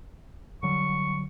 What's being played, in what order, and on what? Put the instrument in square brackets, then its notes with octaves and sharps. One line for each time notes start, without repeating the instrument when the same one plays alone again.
[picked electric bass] D3 F#3 G3 [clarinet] C#6